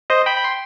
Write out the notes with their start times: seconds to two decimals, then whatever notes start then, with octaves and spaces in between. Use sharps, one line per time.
0.10 C5 D#5
0.26 G5 B5
0.37 B5
0.44 C6